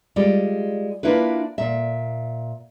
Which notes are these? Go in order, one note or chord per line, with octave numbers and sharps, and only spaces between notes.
G3 G#3 F4 D5
A#3 D4 E4 F4 B4
A#2 E5